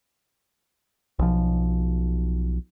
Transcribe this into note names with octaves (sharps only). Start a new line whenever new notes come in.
B1 F3